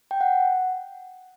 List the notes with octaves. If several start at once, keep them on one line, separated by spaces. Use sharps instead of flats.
G5
F#5